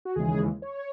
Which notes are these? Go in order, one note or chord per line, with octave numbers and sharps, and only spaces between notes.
F#4
D#2 C#3 E3 G#3 G#4
C#5